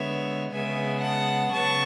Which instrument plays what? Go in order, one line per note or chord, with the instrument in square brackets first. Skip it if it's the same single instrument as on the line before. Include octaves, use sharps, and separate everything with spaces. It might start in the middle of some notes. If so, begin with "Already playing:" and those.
Already playing: [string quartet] D3 G#3 B3 C#5 E5
C#3 G#3 B3 E5 G#5
F#5 A5
C#3 F#3 B3 A5 C#6